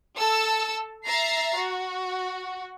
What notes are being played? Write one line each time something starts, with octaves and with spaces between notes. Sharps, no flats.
A4 A5 E6
E5 A#5 A6 C7
F#4